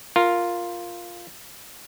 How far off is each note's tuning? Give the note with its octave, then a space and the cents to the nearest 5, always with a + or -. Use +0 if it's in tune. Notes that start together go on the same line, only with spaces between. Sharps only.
F4 +0 A#4 +0